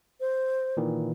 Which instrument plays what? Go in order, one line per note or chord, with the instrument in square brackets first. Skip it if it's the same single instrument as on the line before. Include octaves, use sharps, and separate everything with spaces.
[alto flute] C5
[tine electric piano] A#2 D#3 E3